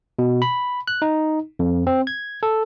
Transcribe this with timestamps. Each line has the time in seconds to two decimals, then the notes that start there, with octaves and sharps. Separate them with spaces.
0.19 B2
0.42 B5
0.88 F#6
1.02 D#4
1.59 F2
1.87 C4
2.07 G#6
2.43 A4